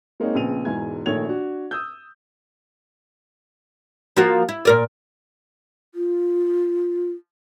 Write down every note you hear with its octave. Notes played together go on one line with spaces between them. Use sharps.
G#3 A#3 C4 D#4 C#5
A#1 C#3 B3 C4 D#7 F7
E1 E2 G#2 G#5 G#6
A#1 D#3 A3 C#5 G#6 F7
D4 F#4
D#6 E6 G6
F3 A#3 F#4
E4
A#2 A#4 D5
F4